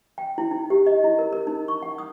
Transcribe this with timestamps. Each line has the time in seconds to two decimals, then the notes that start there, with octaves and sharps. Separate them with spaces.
0.18 G5
0.38 E4
0.51 D#4
0.70 G4
0.86 D#5
1.04 E4
1.19 A#4
1.33 A#4
1.47 D#4
1.68 C#6
1.82 F#5
1.98 D#6